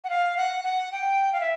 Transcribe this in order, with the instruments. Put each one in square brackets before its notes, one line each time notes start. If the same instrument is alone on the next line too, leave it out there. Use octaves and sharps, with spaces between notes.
[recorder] F#5
F5
F#5
F#5
G5
F5
E5